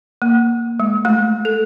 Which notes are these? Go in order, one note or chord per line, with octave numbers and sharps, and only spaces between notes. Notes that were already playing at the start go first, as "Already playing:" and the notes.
A#3
G#3
A3
A4